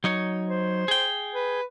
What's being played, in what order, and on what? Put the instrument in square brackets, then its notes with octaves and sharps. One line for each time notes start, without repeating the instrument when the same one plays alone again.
[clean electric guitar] F#3 D#4 C#5
[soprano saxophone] C5
[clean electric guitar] G#4 G5
[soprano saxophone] B4